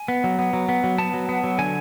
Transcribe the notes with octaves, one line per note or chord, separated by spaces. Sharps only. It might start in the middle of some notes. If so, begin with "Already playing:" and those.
Already playing: G#5
B3
F#3
B3
F#3
B3
F#3
B3 A5
F#3
B3
F#3
D3 G#5